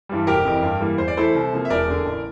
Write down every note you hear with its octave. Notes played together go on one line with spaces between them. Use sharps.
G2 E3 G3
F1 G4 A#4
F2 E3
G2
E3 G3 A#3
E2 C5
D5
E3 A3 E4 A4 C5
C2
C3 F3 A#3
E5
E1 A#4 D5
E2 D3
A1